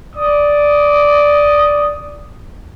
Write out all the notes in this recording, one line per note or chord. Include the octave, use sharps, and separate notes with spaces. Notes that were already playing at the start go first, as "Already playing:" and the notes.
D5 D#6